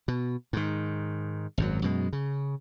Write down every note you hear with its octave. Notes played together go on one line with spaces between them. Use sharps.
B2
G#2 D#3
G#1 F#2 F#3
F#2 B2 G#3
C#3